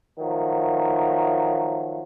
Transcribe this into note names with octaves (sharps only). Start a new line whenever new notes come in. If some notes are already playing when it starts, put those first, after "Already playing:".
D#3 F3 F#3 A3